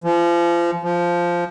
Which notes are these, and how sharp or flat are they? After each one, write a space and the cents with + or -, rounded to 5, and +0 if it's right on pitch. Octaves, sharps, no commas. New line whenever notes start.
F3 -30
F3 -5